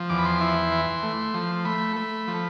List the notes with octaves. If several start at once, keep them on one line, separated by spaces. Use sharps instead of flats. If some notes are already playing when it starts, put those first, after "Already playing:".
Already playing: F3
E2 D6
B5
C6
E4
E3
A3
F3
A3 B5
A3
F3